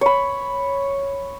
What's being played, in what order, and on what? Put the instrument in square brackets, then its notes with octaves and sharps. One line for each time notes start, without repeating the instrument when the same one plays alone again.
[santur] C#5 B5